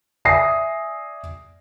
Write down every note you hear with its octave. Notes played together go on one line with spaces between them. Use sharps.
D5 E5 G#5 D#6 A#6 C7